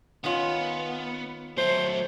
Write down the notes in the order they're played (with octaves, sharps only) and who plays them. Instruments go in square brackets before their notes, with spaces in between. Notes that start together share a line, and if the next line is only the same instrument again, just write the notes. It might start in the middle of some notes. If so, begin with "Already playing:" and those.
[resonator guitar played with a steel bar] D#3 C#4 F4 [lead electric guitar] B3
[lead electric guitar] F#3 A3 [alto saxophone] C5